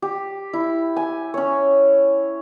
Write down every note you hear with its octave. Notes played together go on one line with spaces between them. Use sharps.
G4
E4
G#5
C#4 C#5